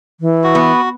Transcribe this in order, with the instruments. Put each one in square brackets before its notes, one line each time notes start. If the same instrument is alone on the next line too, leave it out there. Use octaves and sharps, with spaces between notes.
[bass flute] E3
[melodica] F#4
[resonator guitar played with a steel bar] B3